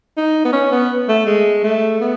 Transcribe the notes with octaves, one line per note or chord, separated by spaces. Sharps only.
D#4
B3
C#4
B3
A3
G#3
A3
B3